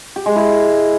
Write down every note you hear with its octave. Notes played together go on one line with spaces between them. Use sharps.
G4
G#3
E4